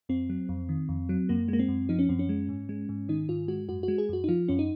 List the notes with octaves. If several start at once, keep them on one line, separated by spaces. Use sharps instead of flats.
F2 C4
F#3
F2
D#3
F2
F#3
F#2 A#3
G#3 A#3
C4
F#2
F3 D#4
C#4
F#2 C4
C#4
G#3
G#2
G#3
G#2
D#3 D#4
G#2 F4
G#3 F#4
F#2 F#4
G#3 F#4
G#4
F#2 F#4
D#4
F3 F4
F#2 C#4
D#4